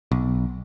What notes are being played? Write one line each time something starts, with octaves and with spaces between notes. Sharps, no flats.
B1